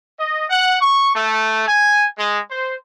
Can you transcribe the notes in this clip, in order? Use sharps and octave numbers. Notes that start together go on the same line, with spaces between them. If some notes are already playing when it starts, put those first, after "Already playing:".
D#5
F#5
C#6
A3
G#5
G#3
C5